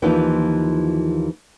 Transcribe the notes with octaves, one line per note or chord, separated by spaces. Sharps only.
D#2 E3 F3 A#3 D#4 F4